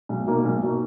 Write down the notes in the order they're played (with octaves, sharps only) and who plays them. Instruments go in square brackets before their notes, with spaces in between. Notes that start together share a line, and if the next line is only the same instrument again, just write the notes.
[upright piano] B1
B2 A#3 D#4
B1
B2 A#3 D#4